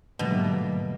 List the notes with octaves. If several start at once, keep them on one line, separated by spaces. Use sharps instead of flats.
G#2 B2 D3 F#3 G3 A3 A#3